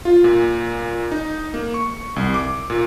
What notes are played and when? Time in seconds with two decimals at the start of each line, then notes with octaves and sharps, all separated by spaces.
0.05 F4
0.24 A#2
1.12 D#4
1.54 A#3
1.74 C#6
2.16 C2
2.34 D6
2.70 A#2